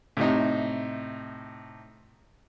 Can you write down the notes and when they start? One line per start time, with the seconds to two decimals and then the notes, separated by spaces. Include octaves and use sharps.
0.17 A2 C3 D#4